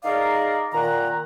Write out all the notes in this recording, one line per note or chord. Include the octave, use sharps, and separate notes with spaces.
D#4 G#4 A#4 D5 F5
A#2 D#3 F#5 A#5